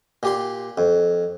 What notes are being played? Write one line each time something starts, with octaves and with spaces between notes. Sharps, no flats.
A#2 G4 C6
F2